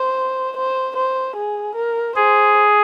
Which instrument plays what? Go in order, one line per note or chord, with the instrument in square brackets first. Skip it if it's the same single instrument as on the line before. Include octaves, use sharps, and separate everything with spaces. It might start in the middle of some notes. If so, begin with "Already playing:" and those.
Already playing: [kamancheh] C5
C5
C5
G#4
A#4
[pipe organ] G#4 [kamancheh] C5